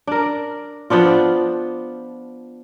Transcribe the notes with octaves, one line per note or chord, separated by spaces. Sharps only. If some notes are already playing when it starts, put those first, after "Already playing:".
D4 A#4
F3 B3 D4 F4